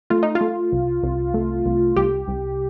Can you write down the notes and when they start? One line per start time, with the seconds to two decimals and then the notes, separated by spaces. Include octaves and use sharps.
0.10 A3 F4
0.23 D#4
0.35 F4
0.41 A3
0.72 C2
1.03 C2
1.34 A3
1.66 C2
1.96 C2 G4
2.28 C2